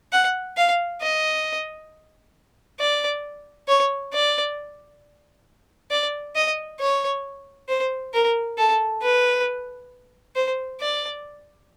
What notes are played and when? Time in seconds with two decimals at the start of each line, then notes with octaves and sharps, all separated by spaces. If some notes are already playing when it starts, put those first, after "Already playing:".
0.13 F#5
0.57 F5
1.02 D#5
2.79 D5
3.68 C#5
4.13 D5
5.91 D5
6.35 D#5
6.80 C#5
7.69 C5
8.14 A#4
8.58 A4
9.02 B4
10.36 C5
10.80 D5